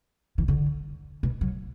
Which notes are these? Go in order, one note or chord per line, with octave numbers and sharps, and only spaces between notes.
E3
D3
B2
F#3